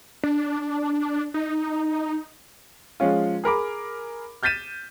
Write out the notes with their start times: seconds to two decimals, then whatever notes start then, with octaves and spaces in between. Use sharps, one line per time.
0.24 D4
1.34 D#4
3.00 F3 G#3 C#4 F4
3.44 G#4 A#4 B5 D6
4.43 F6 G6 A6 B6 D#7 E7